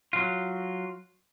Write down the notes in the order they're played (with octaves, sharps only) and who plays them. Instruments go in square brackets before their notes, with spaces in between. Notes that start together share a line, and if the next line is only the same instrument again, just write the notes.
[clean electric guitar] F#3 F4